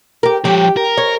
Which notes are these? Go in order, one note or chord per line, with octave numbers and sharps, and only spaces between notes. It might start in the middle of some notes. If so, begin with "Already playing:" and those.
G4 A#4
F3 G4 C#5
A#4
C#5